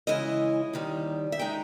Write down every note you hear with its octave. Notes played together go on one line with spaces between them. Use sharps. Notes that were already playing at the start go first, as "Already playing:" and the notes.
C#3 E3 G#3 C#4 E4 D#5
D#2 D#3 G3
E5
D#3 G#3 D#4 G5